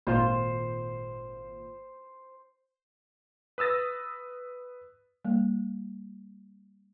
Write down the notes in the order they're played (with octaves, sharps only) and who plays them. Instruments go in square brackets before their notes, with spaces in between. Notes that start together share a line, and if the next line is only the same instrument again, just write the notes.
[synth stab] G#1 A#2 F4 [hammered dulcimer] C5
[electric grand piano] B4 D#6 E6 A6 A#6
[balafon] G3 A#3